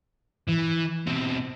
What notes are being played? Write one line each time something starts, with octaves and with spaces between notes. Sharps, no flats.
E3
B2 C4